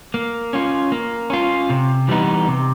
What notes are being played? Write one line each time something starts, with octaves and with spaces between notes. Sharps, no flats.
A#3
C#4 F4
A#3
C#4 F4
C3
E3 G3 B3 D#4
C3